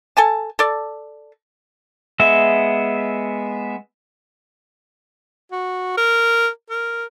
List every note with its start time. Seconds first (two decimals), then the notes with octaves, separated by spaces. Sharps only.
0.17 A4 G#5 A5
0.59 A4 D5
2.20 G#3 B3 E5
5.52 F#4
5.97 A#4
6.70 A#4